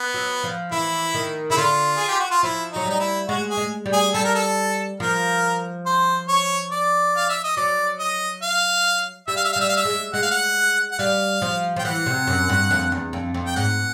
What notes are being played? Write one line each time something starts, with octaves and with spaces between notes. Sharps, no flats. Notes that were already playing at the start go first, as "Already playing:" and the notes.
Already playing: B3
F#3
F3
E3 E4
D#3
C#3 E4
D3 F4
G#4
G4
F#4
F4
F3 E4
F#3 D#4
G3 D#4
E4
G#3 F#4
G#4
G#3
G3
G#4
G3 A4
A#4
A4
F3 A#4
C5
C#5
D5
F5
E5
D#5
F#3 D5
D#5
F5
G3 E5
F5
E5
F5
G3 E5
F5
E5
G#3
G#3 F#5
F5
F#5
F#5
G3 F5
F3
F3 G5
E3 F#5
C3
F#2
G2
F2
E2
F2
F2
G5
G#2 F#5